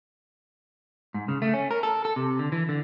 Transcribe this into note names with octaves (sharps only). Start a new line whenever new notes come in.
G#2
C#3
A3
C#4
A#4
A4
A4
C3
D3
E3
D3